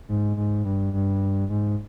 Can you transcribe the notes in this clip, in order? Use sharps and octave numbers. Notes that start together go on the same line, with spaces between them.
G#2
G#2
G2
G2
G#2